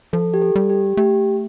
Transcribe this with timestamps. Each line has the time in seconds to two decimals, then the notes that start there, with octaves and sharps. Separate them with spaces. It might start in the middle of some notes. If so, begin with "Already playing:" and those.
0.13 F3 A4
0.34 G4
0.42 A4
0.56 G3
0.70 G4
0.97 A3 G4